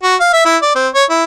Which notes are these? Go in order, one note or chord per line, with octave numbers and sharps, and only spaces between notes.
F#4
F5
E5
E4
D5
C4
C#5
E4